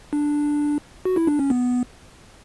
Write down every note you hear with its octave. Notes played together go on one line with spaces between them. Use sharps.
D4
F#4
E4
D4
C#4
B3